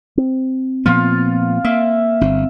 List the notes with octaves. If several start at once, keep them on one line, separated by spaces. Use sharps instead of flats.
C4
A#2 F3 B3 F4
A#3 E5
G1 C4